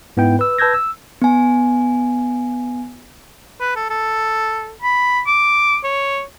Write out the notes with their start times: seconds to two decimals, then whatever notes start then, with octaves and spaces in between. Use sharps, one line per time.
0.17 G#2 B3 E4 G5
0.39 B4 E6
0.58 B4 A5 E6 G6 G#6 A#6
0.74 E6
1.22 B3 G#5
3.60 B4
3.76 A4
3.90 A4
4.82 B5
5.26 D6
5.84 C#5